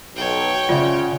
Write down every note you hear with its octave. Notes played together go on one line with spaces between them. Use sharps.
B1 C#5 G5
C#3 C#4 F4 C5 D5 E5 F#5